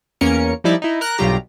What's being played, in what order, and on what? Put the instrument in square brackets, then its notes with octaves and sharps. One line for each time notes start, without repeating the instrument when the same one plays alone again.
[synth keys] E2 A#3 C#4 A#4 C#7
F3 G3 D#4 E4 D5 E5
D#4 E4
A#4 A#5 F#6
B1 G2 F#3 F4 G4 A#5